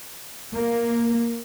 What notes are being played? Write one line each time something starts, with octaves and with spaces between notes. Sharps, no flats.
A#3